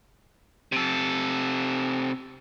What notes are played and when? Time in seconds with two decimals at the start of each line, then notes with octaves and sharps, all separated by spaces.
0.72 C3 A4